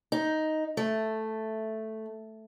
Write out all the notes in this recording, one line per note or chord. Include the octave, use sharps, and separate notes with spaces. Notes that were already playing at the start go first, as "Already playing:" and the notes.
D#4
A3